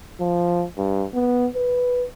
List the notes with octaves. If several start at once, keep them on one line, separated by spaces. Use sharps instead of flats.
F3
G2
B3
B4